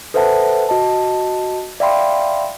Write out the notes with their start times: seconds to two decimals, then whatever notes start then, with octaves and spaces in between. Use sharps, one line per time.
0.14 A4 B4 C5 E5 F#5 A5
0.69 F#4 D#5 A5
1.80 D5 E5 F5 G5 B5 C6